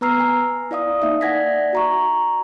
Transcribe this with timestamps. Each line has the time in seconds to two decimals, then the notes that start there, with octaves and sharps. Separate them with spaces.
0.01 B3 B4 A#5 E6 F6 C7
0.20 G#5
0.71 E4 D5 F5 D#6
1.02 A#3 D#4 E5
1.21 D5 F#5 G#5 G#6 A#6 B6
1.73 F#4 A#5 C#6